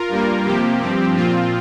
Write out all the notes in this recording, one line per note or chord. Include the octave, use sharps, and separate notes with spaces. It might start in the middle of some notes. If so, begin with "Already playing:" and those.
Already playing: F4 A#4
G2 G3 A#3
C3 F3 A#3 G4
G2 F3 C4
A#2 F3 C4 F4